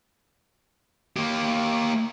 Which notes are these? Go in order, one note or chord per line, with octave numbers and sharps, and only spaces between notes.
A#3 G4